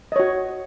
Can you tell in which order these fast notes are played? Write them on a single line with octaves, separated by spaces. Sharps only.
D#5 C#5 F#4